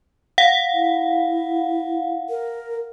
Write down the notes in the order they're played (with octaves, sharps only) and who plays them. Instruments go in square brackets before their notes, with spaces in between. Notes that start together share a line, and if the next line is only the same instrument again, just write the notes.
[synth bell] F5 F#5
[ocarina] E4
A#4